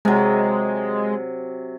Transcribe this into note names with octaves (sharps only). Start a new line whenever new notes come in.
C3 F#3 G#3